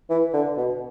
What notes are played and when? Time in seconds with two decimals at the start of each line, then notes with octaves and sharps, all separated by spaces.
0.10 E3
0.33 D3
0.57 B2